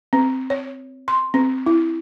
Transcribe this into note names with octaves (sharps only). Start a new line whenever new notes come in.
C4
C#5
C6
C4
E4